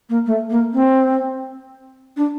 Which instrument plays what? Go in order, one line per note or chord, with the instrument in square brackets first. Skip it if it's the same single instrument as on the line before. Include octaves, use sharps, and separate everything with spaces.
[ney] A#3
A3
A#3
C4
D4